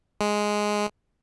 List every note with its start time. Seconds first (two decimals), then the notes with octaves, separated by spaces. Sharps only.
0.21 G#3